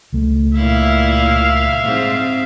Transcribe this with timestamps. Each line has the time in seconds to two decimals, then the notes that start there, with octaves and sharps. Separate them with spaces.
0.13 C#2 A3
0.56 A#2 E4 E5 F5
1.83 G#2 C4